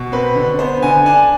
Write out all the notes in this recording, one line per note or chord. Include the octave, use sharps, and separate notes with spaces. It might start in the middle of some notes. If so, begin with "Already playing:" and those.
Already playing: B2
C4 B4
D3
B3 C5
D3 G#5
D4 G#5